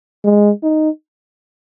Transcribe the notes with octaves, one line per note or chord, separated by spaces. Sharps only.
G#3
D#4